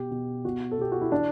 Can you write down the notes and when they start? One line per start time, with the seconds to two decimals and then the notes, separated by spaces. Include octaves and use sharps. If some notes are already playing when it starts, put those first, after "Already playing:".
Already playing: B2 G4
0.11 B2
0.45 B2 F#4
0.71 A4
0.79 B2 G4
0.92 F#4
1.01 E4
1.11 E3 D4